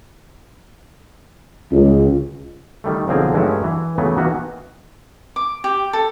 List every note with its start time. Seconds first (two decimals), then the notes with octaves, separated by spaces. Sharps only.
1.71 C#2
2.84 D#3 G3 A3
3.08 B1 D3 F3 C4 G#4 A#4
3.33 G2 F#3 G#3 A3 C#4 E4
3.64 E3
3.98 C#3 E3 F#3 A3 B3
4.17 D#3 E3 A#3 B3 F#4
5.36 D6
5.64 G4
5.93 A4